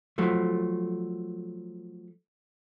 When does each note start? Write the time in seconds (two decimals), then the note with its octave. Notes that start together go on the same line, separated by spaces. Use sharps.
0.18 F3 F#3 A3